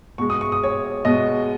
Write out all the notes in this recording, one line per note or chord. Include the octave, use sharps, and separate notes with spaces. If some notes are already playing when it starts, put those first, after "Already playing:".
B2 G#3 C#6
D#6
C#6
D#6
C#5 C#6
B2 G#3 D#5 D#6